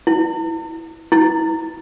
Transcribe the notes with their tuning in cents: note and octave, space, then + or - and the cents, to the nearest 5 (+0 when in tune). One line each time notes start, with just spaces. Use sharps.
E4 -10
E4 -20